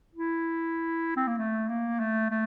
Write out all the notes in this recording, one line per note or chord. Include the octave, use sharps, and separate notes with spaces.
E4
C4
A#3
A3
A#3
A3
A3